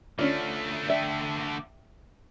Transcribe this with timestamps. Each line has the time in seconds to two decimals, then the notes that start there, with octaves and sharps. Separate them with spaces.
0.19 D3 A3 C#4 D4 F4
0.89 D5 E5 G5